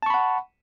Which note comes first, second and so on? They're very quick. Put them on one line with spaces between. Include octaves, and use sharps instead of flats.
A5 C#6 B5 F#5